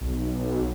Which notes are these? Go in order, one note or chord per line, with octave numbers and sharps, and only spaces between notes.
B1